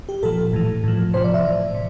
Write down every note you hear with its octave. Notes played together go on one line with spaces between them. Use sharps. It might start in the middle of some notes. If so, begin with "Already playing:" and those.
G4
A#2 F3 A4
A2 E3
A2 F3
C3 F3 C5
D5
E5
A2 E3 D5
C3